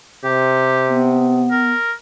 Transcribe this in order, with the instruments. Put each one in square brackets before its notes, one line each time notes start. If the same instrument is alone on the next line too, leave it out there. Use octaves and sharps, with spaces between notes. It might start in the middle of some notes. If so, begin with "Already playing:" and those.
[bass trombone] C3 [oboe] G4
[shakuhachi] B3
[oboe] A#4